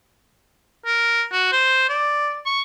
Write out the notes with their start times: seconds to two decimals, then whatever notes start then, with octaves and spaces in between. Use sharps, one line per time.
0.86 A#4
1.32 F#4
1.52 C5
1.89 D5
2.46 C#6